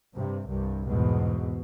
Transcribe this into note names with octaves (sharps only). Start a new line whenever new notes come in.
G2 C3
C2 G2
E2 G#2 B2